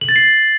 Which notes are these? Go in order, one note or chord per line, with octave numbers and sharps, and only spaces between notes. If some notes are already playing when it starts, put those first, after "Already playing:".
F#7
A6
C7